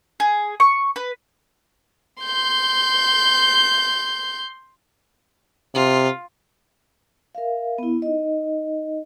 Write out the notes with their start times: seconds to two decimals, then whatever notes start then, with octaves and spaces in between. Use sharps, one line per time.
0.20 G#4
0.60 C#6
0.96 B4
2.23 C6 G6
5.75 C3 F4
7.35 A#4 E5 F5
7.78 B3 E4
8.02 D#4 D#5